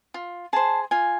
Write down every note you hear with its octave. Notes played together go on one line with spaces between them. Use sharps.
F4
G#4 C5 A5
F4 G#5